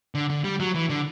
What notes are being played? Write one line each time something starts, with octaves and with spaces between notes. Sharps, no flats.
D3
D3
G3
F#3
E3
D3